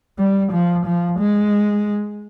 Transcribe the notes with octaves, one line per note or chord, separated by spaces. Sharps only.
G3
F3
F3
G#3